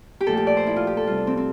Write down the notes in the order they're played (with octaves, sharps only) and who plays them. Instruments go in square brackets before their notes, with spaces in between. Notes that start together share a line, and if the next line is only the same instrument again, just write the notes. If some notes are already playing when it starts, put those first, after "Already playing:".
[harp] G4
A#2 F3 A3 A4
G4
D5
C5
E4
F4
G4
A4
C3 G3 F4
D4
C4
C4